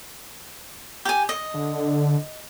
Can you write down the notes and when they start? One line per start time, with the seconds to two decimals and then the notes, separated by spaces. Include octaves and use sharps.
1.05 G4 G#5
1.29 D#5
1.54 D3